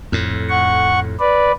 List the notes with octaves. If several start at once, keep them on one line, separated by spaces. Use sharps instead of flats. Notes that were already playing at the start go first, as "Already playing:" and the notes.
F2 A2
F#5 C#6
B4 D5